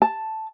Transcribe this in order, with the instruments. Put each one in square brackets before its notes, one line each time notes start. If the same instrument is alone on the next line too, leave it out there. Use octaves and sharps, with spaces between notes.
[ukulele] A5